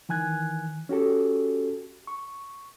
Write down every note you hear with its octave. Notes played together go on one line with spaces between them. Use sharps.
D#3 E3 G#5 F#6 G#6
C#4 F#4 G4 A4
C#6